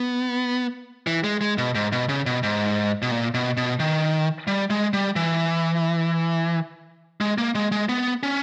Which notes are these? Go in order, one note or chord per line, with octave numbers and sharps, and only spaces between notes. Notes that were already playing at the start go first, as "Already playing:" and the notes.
Already playing: B3
E3
G#3
G#3
B2
G#2
B2
C#3
B2
G#2
B2
A#2
B2
B2
D#3
G3
G#3
G3
E3
G#3
A#3
G#3
G#3
B3
C#4